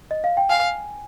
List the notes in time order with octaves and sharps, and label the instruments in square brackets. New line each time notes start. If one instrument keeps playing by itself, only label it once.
[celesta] D#5
F5
G5
[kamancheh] F5 [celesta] G#5